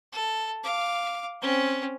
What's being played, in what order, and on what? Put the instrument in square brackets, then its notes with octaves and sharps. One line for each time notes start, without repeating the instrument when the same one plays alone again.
[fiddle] A4
F5 D6
C4 C#4